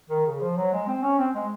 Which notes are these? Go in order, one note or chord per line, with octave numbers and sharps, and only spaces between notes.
D#3
C#3
F3
F#3
G#3
C4
C#4
C4
G#3